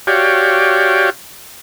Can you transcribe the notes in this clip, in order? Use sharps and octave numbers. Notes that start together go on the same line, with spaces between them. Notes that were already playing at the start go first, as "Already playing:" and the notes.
F#4 G4 C#5 D5 F5 G5